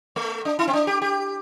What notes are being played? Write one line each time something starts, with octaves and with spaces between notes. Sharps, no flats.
A3
D4
E4
C4
D4
G4
G4